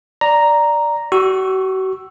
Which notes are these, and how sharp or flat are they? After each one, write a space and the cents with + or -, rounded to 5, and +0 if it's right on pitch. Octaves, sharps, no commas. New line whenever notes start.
D5 +0 A#5 +0
F#4 +40 C#6 -15 E6 +5